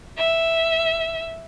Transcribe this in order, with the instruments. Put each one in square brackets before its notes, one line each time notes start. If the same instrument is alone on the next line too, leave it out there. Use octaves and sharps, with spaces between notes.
[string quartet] E5